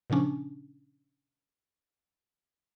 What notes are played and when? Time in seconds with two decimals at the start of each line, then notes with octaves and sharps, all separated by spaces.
0.10 A#2 C#3 F3 C#4 D4